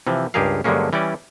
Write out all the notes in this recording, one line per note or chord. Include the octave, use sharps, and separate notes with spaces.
C3 E3 F3
C#2 G2 G4 G#4 A#4 F5
G2 D3 F#3 G#3 A#3 C#4
E3 G3 C#4 D5